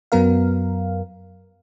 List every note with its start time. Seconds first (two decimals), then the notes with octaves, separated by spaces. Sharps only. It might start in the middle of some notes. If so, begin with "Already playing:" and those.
0.12 F#2 F#3 B3 A#4 F5